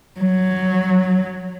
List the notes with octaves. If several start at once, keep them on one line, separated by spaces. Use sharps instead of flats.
F#3